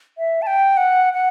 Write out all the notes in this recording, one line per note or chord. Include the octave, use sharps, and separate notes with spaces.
E5
A5
G5
F#5
F#5